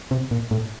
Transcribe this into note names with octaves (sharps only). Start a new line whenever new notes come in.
C3
A#2
A2